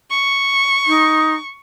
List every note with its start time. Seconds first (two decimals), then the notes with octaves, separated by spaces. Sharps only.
0.10 C#6
0.87 D#4